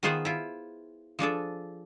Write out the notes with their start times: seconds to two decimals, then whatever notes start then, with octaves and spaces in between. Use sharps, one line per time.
0.03 D#3 B3 F4 G#4 C5 F#5
0.25 E4 F4
1.19 F3 D4 G#4 A4